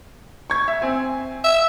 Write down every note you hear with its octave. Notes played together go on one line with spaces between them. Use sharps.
C#6 G#6
E5
C4 G#5
E5